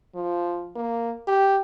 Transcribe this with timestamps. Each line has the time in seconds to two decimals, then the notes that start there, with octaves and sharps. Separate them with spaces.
0.15 F3
0.76 A#3
1.28 G4